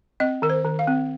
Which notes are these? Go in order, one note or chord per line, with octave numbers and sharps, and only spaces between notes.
C4 D#5
D#3 A#4
C5
D#3
F5
C4